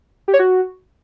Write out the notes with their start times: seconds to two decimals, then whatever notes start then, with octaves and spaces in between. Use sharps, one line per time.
0.28 G4
0.33 C#5
0.39 F#4